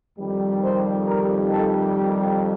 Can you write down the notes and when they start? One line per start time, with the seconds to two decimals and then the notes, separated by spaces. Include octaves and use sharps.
0.19 F2 D#3 G3
0.63 C5
1.07 A#4
1.52 A4
1.95 G4